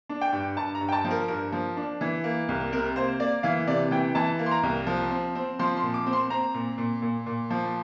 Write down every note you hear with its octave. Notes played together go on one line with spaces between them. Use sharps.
D4
G5
G2
G2 A5
A#5
G2
G5
A5
F3
A#4
G2 A#4
F3
D4
E3
A#3
C2
C3 A#4
A#3 C5
A#3 D5
E3 F5
C3 D5
E3 G5
E3 A5
A#3
C6
A#5
C2
F3
C4
C4
F3 C6
C6
A#2
D6
C4
C6
C4 A#5
A#2
A#2
A#2
A#2
F3